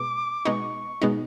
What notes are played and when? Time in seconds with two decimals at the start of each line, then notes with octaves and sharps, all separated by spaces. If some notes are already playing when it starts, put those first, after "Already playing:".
Already playing: B2 G#3 B3 D6
0.45 B2 G#3 B3 D#4 C#6
1.02 B2 G#3 B3 D#4